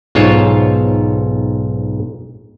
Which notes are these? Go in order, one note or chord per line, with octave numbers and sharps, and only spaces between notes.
B1 G#2 F4 C5 C#5